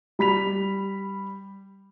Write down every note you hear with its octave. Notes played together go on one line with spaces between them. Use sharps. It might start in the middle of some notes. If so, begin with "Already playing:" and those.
G3 B5 B6 F7